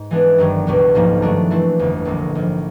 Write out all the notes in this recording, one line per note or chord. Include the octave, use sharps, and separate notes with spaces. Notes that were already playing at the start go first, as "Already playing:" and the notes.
Already playing: G#2
E3 G#3 B3 D4
G#1 G2 D#3 F#3
C#2 B2 G3 B3
A1 G#2 F3 A#3
G2 D#3 F#3 A3 D4
E3 A3 C4 E4
G1 F2 D3
A#1 A#2 G3 A#3
A#1 G#2 F3